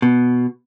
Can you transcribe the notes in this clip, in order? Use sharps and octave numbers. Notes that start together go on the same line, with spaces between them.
B2